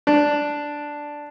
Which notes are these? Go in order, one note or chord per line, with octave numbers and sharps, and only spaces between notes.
D4